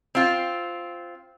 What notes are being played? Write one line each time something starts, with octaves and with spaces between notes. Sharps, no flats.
C4 F4